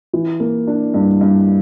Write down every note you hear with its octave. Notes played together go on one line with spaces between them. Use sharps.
E3
A#3
D4
G2
G2